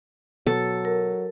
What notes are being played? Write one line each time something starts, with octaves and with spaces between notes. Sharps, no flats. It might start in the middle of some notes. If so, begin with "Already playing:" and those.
B2 F#3 A4
A#4